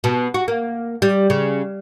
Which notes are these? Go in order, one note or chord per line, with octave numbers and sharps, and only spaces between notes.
B2
F#4
A#3
G3
C#3